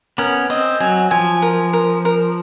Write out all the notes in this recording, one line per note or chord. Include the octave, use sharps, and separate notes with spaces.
B3 C#4 A#4
C4 D#5
F#3 G#5
F3 G#5
A#4
A#4
A#4